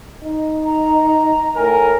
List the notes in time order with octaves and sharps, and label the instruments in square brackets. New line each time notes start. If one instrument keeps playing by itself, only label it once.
[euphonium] D#4
[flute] A#5
[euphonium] A2 [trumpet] A#4 [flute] G#5